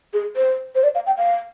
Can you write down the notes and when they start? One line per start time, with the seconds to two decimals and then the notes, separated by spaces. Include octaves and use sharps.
0.13 G#4
0.36 C5
0.75 C5
0.83 D5
0.95 F5
1.06 G5
1.18 F5